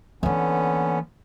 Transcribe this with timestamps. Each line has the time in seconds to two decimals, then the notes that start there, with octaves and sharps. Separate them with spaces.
0.23 D3 E3 A#3 B3 C#4